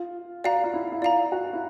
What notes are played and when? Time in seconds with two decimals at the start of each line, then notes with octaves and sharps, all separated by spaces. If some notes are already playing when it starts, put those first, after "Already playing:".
Already playing: F4
0.44 F#4 D5 F5 A#5
0.64 F4
0.74 E4
0.92 E4
1.02 F4 D5 F5 A#5
1.32 F#4
1.53 E4